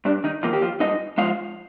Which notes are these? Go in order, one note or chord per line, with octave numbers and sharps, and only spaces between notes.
G2 D4
D#3 D#4
D#3 F3 A#3 F4
G4
F3 F4
G2 D#4 D#5
F3 G#3 F4 F5